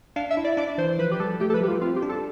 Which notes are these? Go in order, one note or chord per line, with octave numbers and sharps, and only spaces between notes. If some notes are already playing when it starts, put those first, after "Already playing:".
D4 F5
E5
E4
D5
D4 D5
E3 C5
F3 B4
G4
G3 A4
A3 G4
A4
F3 B4
G3 G4
F4
C4 F4
G4
D4
A4